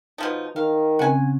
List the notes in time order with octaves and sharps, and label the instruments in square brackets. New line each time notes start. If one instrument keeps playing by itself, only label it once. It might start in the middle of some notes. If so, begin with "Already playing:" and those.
[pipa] B2 F3 D#4
[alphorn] D#3 [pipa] F5
[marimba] C#3 C4 C#4 [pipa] F#5 G#5